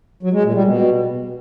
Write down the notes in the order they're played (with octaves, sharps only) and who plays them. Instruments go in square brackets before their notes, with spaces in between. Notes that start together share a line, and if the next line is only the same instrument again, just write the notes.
[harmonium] F#3
G#3
A#2
G3
B2